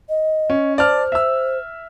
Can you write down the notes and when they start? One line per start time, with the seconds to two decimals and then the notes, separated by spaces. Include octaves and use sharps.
0.09 D#5
0.50 C#4
0.78 C5 D5 A5 F6
1.12 E5 E6